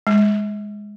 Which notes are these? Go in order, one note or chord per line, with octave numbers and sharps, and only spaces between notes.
G#3